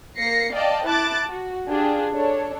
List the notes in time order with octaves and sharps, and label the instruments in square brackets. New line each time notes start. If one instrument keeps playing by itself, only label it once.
[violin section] A#3 A#6 C7 C#7
D5 D#5 F5 G5 A5
E4 A5 D6 F#6 A6
F#4
D4 F4 G4 G#4
D4 A4 C#5